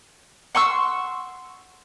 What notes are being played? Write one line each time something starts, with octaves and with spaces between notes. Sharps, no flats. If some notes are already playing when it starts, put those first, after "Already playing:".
F#5 C6 C#6 E6